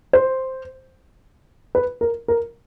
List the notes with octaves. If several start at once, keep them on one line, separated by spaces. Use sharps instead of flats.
C5
B4
A#4
A#4